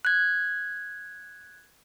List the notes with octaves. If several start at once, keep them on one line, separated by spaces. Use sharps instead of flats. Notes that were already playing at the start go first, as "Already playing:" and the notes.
F#6 G#6